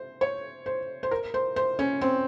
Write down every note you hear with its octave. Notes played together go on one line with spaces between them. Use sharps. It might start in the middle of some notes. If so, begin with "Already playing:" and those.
Already playing: C5
C#5
C5
C5
A#4
C5
C5
C#4
C4